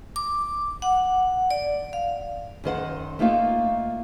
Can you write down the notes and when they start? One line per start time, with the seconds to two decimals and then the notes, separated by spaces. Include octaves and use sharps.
0.16 D6
0.82 F#5
1.51 D5
1.93 F5
2.64 F#2 D#3 C5 F#5
3.19 A3 A#3 D#4 F4 F5